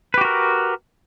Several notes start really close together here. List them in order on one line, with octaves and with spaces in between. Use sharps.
B4 G4 F#4 A#4